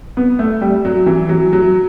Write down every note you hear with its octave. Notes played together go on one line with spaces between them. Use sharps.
B3
A3
G3
F#3
E3
F#3
F#3